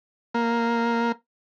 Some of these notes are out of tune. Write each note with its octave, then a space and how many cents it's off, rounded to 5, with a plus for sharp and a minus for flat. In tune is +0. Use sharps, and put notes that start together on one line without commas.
A#3 +0